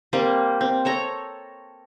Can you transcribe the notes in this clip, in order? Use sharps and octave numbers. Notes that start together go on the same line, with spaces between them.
G3 A#3 C4
C4
A4 C#5 A#5